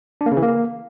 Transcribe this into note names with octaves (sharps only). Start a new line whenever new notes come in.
D4
A#3
C#3
E3
A#3